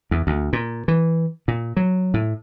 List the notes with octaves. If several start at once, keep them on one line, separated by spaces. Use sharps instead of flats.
E2
D2
A#2
E3
A#2
F#3
A2